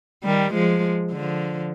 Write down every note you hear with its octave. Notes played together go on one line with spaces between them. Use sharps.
D#3 G3
F3 G#3
D3 F3